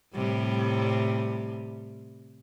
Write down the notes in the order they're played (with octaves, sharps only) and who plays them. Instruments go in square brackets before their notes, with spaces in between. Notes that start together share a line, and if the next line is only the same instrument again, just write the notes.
[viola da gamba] A2 C3 G3